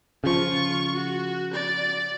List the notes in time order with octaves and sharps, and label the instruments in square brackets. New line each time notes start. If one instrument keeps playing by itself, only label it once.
[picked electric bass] C#3 F3 [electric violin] F4 C#6
[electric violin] F#4
D5